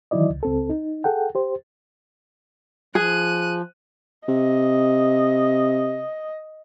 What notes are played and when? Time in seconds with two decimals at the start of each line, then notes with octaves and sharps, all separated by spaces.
0.11 D#3 E3 F#3 E4 D5 D#5
0.30 C#2
0.43 C#2 C4 A4
0.70 D#4
1.04 G#4 A4 F#5 G5
1.35 G4 C5
2.95 F3 G#4 F#6 D#7
4.28 C3 D#5